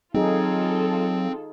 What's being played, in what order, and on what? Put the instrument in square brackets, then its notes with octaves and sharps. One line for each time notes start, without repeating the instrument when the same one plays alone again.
[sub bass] F#3 [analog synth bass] C4 [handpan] D#4 G#4 [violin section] F4 A4